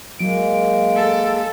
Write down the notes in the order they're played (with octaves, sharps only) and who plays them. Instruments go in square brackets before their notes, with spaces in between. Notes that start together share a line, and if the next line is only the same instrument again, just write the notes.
[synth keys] F#3 D7 [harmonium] G#3 A#3
[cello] A4